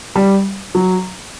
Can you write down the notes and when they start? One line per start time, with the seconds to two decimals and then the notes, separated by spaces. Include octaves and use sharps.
0.16 G3
0.75 F#3